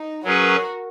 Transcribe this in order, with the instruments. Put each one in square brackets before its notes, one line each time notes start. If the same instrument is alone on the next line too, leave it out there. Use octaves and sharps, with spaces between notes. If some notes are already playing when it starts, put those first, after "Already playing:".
Already playing: [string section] D#4
[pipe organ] F#3 C#4 G#4 B4 [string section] F#4 A#4